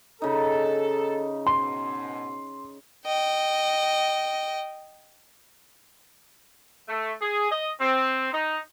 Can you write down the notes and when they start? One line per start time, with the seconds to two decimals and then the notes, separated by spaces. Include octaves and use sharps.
0.22 C#3 D#4 A4
1.47 G#2 B2 C6
3.06 D#5 G5
6.88 A3
7.21 G#4
7.51 D#5
7.80 C4
8.32 D#4